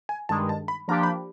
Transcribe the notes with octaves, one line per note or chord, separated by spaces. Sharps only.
G#5
G2 D#3 G#3 A5
A5
B5
F3 A#3 D4 G4 A#5
B5